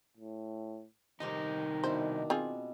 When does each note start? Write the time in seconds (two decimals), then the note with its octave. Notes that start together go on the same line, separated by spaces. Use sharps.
0.17 A2
1.20 C2 D#3 D#4 G4 C5 A#5
1.84 B2 D4 E4 C5
2.30 C4 F4 G#4